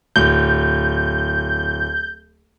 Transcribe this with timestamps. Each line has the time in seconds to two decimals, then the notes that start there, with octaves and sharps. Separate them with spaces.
0.16 D1 G6